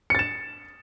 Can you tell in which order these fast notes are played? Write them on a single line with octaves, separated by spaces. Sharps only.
C#7 A6 E7